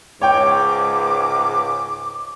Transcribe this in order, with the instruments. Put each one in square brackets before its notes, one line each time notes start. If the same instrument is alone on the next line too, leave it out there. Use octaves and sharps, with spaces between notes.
[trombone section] C#2 G#2 [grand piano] C#5 G5 G6 [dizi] D6